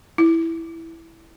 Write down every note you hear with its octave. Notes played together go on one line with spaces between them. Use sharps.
E4